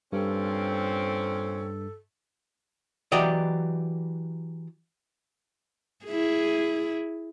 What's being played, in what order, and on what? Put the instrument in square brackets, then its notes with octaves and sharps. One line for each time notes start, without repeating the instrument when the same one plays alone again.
[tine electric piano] G2 [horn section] A#2 C4 C#4 [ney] A4
[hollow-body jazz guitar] E3 F#3 G4 D5 D#5
[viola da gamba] E4 G#4